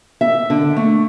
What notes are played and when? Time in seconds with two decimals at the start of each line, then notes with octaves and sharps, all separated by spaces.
0.21 E5
0.50 D3
0.77 A3